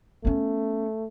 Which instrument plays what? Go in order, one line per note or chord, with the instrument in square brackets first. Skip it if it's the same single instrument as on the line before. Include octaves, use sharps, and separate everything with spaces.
[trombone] A3 [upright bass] B3 C#4